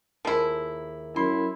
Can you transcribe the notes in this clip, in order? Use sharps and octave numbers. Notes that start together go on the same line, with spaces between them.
D#2 F3 E4 G#4 A#4
F#2 E4 C6